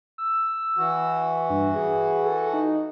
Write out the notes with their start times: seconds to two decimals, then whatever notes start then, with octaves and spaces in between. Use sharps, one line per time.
0.18 E6
0.77 E3 F#4
1.50 G2
1.75 G#4
2.25 A4
2.53 D#4